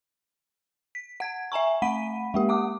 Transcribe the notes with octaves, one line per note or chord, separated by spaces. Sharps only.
B6
F#5 G#6
E5 G#5 A#5 C#6
A3 F#5 B5 B6 D#7
G#3 A#3 G4
F#5 D6 D#6